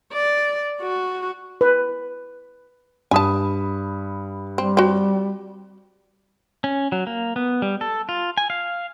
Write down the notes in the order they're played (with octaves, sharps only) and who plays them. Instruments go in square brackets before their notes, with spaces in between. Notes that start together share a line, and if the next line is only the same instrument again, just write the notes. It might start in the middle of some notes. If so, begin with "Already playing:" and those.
[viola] D5
F#4
[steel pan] B4
[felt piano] G2 B5 D#6 [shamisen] G#5 A5
[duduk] G3 [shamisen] C4
[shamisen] C4 F#4
[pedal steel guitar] C#4
F#3
A#3
B3
G3
A4
F4
G#5
F5